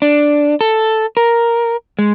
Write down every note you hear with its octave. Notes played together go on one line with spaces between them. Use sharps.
D4
A4
A#4
G#3